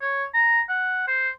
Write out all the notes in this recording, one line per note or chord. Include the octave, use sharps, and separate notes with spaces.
C#5
A#5
F#5
C5